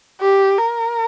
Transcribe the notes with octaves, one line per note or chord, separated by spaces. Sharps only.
G4
A#4